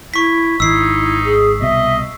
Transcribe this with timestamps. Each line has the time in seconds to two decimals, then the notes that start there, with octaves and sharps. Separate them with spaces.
0.14 E4 C#6 B6
0.60 G#1 D#3 D#4 E4 E6 C7
1.24 G#4
1.62 C2 B2 D#5 E5